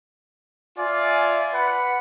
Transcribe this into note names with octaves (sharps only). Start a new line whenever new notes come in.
F4 D5 E5 G#5
B4 F#5 B5